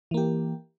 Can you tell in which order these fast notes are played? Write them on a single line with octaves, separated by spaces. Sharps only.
E3 A#3 G4